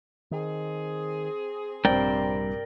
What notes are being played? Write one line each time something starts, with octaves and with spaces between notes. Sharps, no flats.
D#3 C4 G#4
A#1 G2 C3 C4 A#4 D5 G5